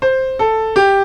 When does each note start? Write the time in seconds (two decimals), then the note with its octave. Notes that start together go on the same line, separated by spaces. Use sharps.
0.02 C5
0.39 A4
0.76 G4